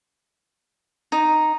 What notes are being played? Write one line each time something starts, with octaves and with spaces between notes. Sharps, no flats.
D#4